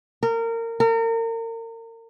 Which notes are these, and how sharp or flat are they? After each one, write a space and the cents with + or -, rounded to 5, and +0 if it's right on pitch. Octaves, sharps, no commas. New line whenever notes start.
A#4 -25
A#4 -35